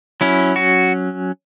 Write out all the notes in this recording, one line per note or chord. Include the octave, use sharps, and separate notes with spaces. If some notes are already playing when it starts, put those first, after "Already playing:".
F#3 C#4 E4
F#4